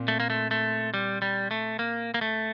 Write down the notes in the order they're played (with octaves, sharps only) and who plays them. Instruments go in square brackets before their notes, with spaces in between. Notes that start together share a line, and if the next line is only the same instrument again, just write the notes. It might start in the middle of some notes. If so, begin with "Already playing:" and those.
Already playing: [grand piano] A#2 C4
[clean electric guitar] A3
A#3
A3
A3
G3
G3
A3
A#3
A#3
A3